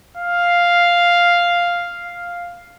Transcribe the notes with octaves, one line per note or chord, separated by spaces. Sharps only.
F5
F5